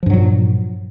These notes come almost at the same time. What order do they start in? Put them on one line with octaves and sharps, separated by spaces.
F3 G2 F#3 A#2